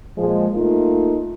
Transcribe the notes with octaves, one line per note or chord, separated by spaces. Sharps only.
A#2 F3 G#3
A3 A#3 D#4 F4